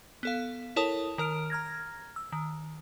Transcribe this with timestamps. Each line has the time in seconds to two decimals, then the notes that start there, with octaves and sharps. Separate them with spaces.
0.23 B3 A4 F5
0.76 E4 A4 A#4 C#5 A5 D#6
1.18 D#3 A#4 F6 D7
1.50 A#5 F6 G#6 A#6
2.16 E6
2.32 D#3